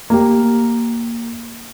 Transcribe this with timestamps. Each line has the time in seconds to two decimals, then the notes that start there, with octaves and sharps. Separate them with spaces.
0.10 A#3 G4